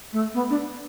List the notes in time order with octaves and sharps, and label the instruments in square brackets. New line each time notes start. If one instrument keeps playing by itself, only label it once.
[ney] A3
B3
D4